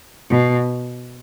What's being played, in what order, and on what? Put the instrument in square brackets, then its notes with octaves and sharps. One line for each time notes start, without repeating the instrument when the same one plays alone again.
[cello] B2